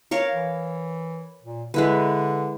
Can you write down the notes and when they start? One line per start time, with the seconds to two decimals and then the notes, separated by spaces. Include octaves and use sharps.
0.11 A#4 C#5 F5
0.32 E3
1.43 A#2
1.74 D3 G#3 E4 B4